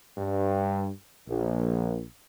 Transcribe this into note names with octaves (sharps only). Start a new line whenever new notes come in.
G2
A#1